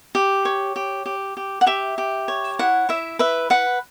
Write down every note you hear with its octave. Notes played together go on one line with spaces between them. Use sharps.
G4
C#5
G4
G4
G4
F#5
G4 E5
G4
C#5
E4 F#5
E4 E5
B4 E5
B4 F#5